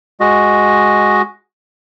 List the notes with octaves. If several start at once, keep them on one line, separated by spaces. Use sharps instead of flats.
G#3 F#4 D#5